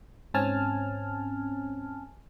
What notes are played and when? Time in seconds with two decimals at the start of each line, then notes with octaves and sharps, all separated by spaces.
0.34 G#2 C4 C#4 G#5 A5 F6